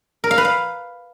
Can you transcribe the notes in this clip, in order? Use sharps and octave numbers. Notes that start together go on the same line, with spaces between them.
A#4
F5
B4
F5